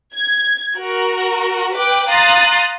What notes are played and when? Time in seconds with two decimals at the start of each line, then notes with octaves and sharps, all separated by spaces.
0.14 G#6
0.76 F#4 A#4
1.75 B4 G5 D6 F#6
2.08 F5 A#5 C6 D#6 F#6 A6